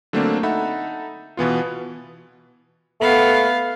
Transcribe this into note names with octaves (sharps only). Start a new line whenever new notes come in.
D3 F#3 A3 A#3 C4 D4
D#4 A4 E5 F#5 B5
B2 E3 B3 F4
A3 B3 F5